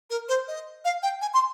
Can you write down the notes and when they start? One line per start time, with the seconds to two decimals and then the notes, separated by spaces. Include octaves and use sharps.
0.10 A#4
0.28 C5
0.48 D#5
0.85 F5
1.03 G5
1.21 G#5
1.34 C6